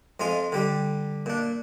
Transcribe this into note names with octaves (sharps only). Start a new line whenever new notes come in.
F2 G#3 F4 G#5
D3 G3 G4
A#2 D4